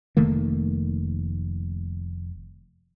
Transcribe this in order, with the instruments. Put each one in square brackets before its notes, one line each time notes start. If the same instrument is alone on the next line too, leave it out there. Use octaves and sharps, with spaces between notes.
[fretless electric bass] F1 D#3 A3 A#3